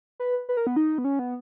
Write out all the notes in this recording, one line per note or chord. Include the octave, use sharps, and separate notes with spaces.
B4
B4
A#4
B3
D#4
B3
C#4
B3